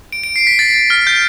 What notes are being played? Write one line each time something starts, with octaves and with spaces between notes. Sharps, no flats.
D7
D7
C7
B6
A6
F6
G6